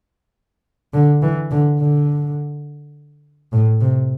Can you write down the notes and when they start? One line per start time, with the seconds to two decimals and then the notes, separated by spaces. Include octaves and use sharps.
0.93 D3
1.22 E3
1.51 D3
1.80 D3
3.53 A2
3.81 C3